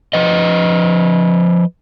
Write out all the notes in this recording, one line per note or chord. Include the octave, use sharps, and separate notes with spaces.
F3 B4 D#5